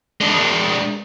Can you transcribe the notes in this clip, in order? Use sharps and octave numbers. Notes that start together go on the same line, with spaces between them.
G#3 D4